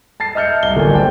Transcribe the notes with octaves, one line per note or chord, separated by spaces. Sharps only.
A5 A6 C7
D#5 E5 F6 G6 C#7
C2 G7
D1 G1 A#3 D5 G#5
C5 G5 A5